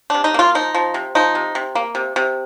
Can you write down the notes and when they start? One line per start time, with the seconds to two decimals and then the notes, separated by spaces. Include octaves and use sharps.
0.10 C3 D4
0.24 D#4
0.34 A#3 F4
0.55 F3 D#4
0.74 F3
0.94 C3
1.15 F3 D#4
1.35 C3
1.55 C3
1.75 A#3
1.95 C3
2.16 C3